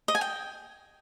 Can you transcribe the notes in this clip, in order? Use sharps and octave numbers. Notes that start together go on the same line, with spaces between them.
D#5
G#5
G5